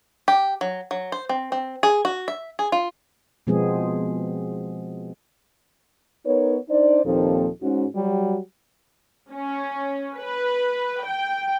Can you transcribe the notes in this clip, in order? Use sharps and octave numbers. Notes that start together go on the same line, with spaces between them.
G4
F#3
F#3
C5
C4
C4
G#4
F#4
E5
G#4
F4
B2 F3 G#3 B3 C4 G#4
B3 D#4 A#4 B4 C#5
D4 D#4 C5 D5
D#2 A#2 F3 C4 D#4 A4
G#2 C#4 F#4
F#3 G3 F#4 G4
C#4
B4
G5